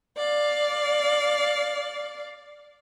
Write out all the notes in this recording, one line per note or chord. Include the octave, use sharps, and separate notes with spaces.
D5 F5